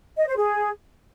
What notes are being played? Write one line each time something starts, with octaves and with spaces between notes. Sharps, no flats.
D#5
C5
G#4